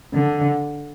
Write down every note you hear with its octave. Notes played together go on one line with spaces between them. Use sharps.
D3